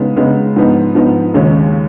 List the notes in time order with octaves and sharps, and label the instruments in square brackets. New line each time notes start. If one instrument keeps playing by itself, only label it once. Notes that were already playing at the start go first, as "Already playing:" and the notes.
Already playing: [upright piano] C#3 G#3 B3 D#4
C#3 G#3 B3 D#4
G#2 F3 B3 D#4
G#2 F3 B3 D#4
D#2 C#3 G#3 C#4